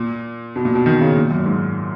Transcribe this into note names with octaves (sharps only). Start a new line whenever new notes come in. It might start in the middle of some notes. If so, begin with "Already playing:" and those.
Already playing: A#2
B2
A#2
B2
D#3
C#3
A#2
F#2
G#2